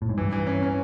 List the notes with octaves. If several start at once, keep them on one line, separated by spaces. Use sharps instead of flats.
A2
G#2
G2 E3
E3
C#4
C#4